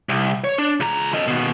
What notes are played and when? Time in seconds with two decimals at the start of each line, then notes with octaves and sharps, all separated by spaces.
0.09 C2
0.44 C#5
0.58 D4
0.80 C#2 A#5
1.14 A4 D#5
1.27 D#2 B2